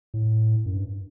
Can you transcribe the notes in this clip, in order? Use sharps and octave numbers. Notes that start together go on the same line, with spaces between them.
A2
F#2
G2